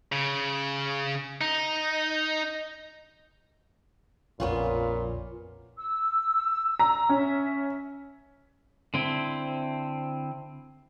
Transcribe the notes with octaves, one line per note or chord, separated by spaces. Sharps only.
C#3
D#4
A#1 F2 A#2 B3 C#4 F4
E6
A#5
C#4 E5
D3 C4 E4